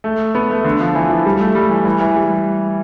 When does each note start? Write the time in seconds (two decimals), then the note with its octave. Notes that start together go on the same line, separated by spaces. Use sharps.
0.04 A3
0.35 B3
0.50 A3
0.64 D3
0.81 F3
0.95 E3
1.10 F3
1.26 G3
1.41 A3
1.55 G3
1.71 E3
1.85 E3
2.01 E3
2.16 G3